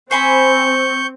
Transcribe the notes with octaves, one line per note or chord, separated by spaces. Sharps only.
C4 C5 G#5 B5 C#6 G6